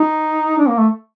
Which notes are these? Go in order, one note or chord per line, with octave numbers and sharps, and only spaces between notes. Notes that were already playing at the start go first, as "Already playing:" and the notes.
Already playing: D#4
D4
A#3
A3